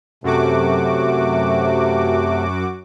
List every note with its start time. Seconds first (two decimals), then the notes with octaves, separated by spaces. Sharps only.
0.24 F#2 C3 A3 F#4 D6